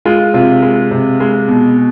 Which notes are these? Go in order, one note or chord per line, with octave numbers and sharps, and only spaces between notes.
G#3 F4
C3 F4
G#3
C3
G#3
B2